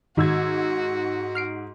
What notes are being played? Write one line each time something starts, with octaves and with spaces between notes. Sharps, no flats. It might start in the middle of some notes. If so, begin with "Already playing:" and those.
G#2 D#3 F#4 E6 G#6
F6 C7 D7